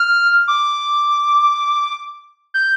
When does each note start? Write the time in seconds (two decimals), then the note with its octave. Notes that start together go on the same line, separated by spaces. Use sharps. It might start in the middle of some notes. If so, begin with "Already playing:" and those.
Already playing: F6
0.48 D6
2.54 G6